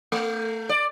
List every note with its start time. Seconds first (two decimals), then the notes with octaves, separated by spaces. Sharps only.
0.12 A3
0.69 D5